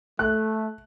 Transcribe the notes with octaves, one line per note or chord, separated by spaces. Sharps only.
A3 F#6